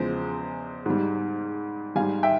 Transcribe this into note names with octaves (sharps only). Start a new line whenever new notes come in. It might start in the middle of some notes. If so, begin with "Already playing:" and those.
Already playing: E2 C#3 F3 G#3 C5
G#2 G3
G#2 G3 F5 G#5
E5 G5